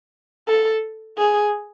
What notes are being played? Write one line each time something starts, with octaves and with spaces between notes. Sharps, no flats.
A4
G#4